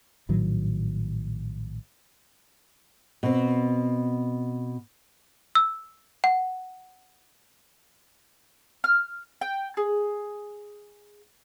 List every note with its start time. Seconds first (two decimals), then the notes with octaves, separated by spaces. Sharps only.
0.29 A#1 A2 D#3 F#3
3.23 B2 C4
5.55 E6
6.24 F#5
8.84 F6
9.41 G5
9.77 G#4